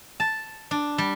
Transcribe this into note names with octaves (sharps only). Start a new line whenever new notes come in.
A5
D4
G3